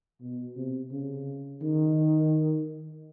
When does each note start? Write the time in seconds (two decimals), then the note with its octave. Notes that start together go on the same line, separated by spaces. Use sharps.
0.21 B2
0.56 C3
0.92 C#3
1.62 D#3